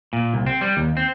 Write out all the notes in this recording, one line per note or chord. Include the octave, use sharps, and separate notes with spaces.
A#2
C2
C4
G3
D#2
C4